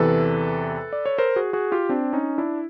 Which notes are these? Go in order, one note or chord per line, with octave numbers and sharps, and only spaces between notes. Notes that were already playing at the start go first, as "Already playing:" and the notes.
Already playing: E2 C3 E3 A4 B4
D5
C#5
A#4 C5
F#4 G#4
F#4 G#4
F4 G4
C4 D4
C#4 D#4
D4 E4